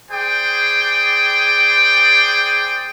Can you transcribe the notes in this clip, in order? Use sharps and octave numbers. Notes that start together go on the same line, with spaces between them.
G#4 C5 D5 G5